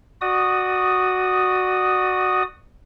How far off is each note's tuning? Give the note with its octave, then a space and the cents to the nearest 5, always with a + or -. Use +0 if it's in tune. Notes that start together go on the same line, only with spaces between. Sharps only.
F#4 +0 D5 +30 D#6 +0